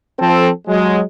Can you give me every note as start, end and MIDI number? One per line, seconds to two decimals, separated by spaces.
0.19 0.49 53
0.19 0.49 60
0.19 0.49 69
0.67 1.01 54
0.67 1.01 56